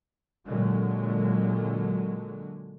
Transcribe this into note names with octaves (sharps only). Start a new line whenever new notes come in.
A#2 D3 F#3 G#3